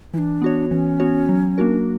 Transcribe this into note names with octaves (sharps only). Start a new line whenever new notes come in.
E3 D4 E4
B3 F#4 C#5
E3 C#4
B3 F#4 C#5
F#3
A#3 D4 F#4 A#4